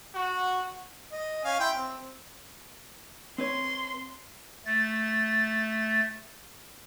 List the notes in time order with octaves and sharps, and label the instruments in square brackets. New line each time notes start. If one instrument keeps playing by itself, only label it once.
[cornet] F#4
[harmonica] D#5
C#4 F5 G#5
E4 G5 C6
C4
[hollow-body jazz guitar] C4 B4 C#5 [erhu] C6
[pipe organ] A3 A6